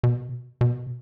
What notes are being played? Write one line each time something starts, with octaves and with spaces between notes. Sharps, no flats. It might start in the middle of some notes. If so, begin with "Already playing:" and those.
B2
B2